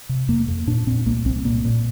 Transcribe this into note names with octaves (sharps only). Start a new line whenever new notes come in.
C3
F2 A#3
F2
A#2 D4
A#2 C4
C2 A#3
C2 C4
A#2 A#3
A#2